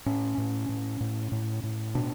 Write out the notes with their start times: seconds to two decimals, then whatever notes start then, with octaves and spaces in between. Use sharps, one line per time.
0.06 A2 C#4
0.38 A2
0.69 A2
1.00 A2
1.32 A2
1.63 A2
1.95 B2 D4